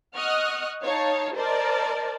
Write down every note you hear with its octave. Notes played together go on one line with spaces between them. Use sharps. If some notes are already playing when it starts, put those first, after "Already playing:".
D#5 F#5 C#6 D#6 F6 F#6
D#4 C#5 F5 A5
A#4 C5 D5 D#5 A5